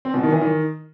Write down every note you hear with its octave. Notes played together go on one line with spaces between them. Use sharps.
C4
B2
D#3
E3
D#3